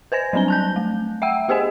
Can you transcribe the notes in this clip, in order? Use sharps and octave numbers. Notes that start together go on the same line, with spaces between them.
B4 C5 G#5 A#6
F#3 G3 C4 D4 G7
A5 F#6 G6
A3
E5 F#5 G5 E6
B3 G4 G#4 C5 D#5 G#5